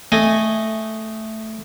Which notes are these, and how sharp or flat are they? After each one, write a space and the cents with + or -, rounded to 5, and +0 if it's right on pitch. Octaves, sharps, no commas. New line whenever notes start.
A3 +0 D#5 +0 G#5 -5